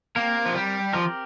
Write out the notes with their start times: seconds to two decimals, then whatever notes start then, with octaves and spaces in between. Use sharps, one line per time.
0.16 A#3 C4 G4 A#4
0.45 F3
0.55 G3
0.93 F3 C4 G4 A#4